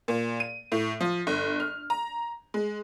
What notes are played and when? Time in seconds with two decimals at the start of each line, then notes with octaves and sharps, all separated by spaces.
0.08 A#2
0.40 D#7
0.72 A2
1.00 F3
1.27 G1
1.60 F6
1.90 A#5
2.54 G#3